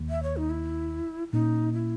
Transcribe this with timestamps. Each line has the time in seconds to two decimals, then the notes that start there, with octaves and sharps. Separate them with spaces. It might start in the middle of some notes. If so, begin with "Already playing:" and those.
Already playing: D#2 D#3 A#3
0.10 E5
0.23 C#5
0.37 D#4
0.50 E4
1.33 A#2 A#3 C#4 D#4
1.74 E4